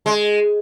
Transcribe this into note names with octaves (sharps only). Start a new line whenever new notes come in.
G#3